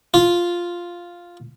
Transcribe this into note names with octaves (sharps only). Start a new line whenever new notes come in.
F4